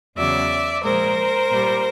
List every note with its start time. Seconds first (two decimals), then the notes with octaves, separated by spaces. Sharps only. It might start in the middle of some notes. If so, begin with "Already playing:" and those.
0.17 E2 C#3 F#3 D5 E5
0.84 A#2 F3 G#3 A#4 C5
1.51 A#2 G3